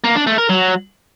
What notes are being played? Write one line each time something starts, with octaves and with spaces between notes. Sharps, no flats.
A#3
D4
A3
A#4
F#3